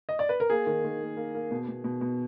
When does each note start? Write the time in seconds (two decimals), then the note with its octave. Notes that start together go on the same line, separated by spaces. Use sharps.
0.09 D#5
0.19 D5
0.29 B4
0.40 A#4
0.50 A#3 G#4
0.67 D#3
0.84 D#3
1.01 A#3
1.17 A#3
1.35 A#3
1.51 B2
1.69 B2
1.84 B2
2.01 B2